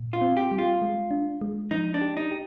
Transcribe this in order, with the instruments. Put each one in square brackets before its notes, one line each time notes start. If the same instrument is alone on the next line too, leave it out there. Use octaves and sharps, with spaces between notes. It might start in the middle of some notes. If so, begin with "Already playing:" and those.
Already playing: [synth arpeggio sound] A#2
[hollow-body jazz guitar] F4
[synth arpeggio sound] C4
[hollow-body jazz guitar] G4
[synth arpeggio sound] G3
[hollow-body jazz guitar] F4
[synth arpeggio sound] G#3
D4
G#3
[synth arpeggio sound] F3 [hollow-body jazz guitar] D#4
[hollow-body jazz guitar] D4
[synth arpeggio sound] G4
[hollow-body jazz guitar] D#4
[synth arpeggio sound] G4